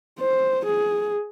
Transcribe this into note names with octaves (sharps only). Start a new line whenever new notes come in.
C5
G#4